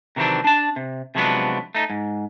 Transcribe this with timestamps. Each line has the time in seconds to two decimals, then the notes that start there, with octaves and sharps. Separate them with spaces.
0.16 C3 D#3 E3 F#3 C4 D4
0.44 D4 A5
0.76 C3
1.15 C3 F3 F#3 G#3 B3 D4
1.75 A3 D#4
1.90 G#2